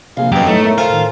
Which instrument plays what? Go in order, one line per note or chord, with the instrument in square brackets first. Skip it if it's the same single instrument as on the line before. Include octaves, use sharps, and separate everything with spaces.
[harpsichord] A#1 [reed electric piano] C3 G#4 [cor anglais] F5
[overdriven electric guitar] F#2 [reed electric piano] G3 D#5 [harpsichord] B3 D6 [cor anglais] G5
[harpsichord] A2 [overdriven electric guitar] A3 [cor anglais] D#4
[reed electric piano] B3 C#5 E5 [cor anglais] A#4
[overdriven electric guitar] F4 [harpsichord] A4 C5 G#5 [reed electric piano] F6
[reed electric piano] A2 D#3